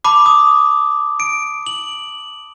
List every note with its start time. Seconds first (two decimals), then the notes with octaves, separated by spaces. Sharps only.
0.05 A5 B5 D6
0.26 D#6
1.20 D7
1.66 F#7